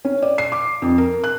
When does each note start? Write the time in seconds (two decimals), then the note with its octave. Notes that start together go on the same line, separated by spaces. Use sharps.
0.05 C#4
0.22 D5
0.38 C7
0.52 D6
0.82 F2
0.98 A#4
1.24 F#6